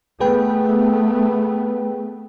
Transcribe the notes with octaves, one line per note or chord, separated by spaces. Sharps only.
A3 B3 G#4 B4 G5